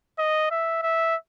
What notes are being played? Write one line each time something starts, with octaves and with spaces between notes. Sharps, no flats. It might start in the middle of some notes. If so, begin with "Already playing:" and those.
D#5
E5
E5